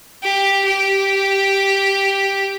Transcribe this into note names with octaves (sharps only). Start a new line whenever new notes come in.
G4
G4